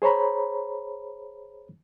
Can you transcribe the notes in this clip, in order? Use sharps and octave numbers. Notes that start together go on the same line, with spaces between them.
G#4 C5 C#5 A#5 B5